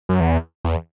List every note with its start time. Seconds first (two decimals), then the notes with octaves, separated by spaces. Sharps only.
0.09 F#2
0.20 E2
0.65 E2